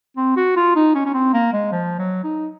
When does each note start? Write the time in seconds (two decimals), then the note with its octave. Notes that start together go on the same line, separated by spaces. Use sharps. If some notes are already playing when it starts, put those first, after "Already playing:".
0.17 C4
0.36 F#4
0.56 F4
0.76 D#4
0.95 C#4
1.05 C#4
1.14 C4
1.33 A#3
1.53 G#3
1.72 F3
1.99 F#3
2.24 D#4